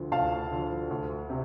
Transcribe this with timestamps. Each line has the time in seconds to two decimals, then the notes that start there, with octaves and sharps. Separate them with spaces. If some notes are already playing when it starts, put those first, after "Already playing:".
Already playing: D2 D3 F3
0.12 D2 F5 A5
0.51 D3 F3
0.90 D2
1.30 C3